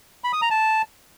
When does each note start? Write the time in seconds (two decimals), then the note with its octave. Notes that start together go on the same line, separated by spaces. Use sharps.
0.24 B5
0.33 D#6
0.42 A#5
0.50 A5